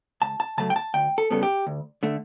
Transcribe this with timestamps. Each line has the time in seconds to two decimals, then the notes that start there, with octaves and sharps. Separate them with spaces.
0.22 C#2 A5
0.40 A5
0.58 C#3 F#3 A3 A5
0.70 G5
0.76 A5
0.94 D2 G5
1.18 A4
1.31 C#3 G3 B3 A4
1.43 G4
1.67 D2
2.03 D3 A3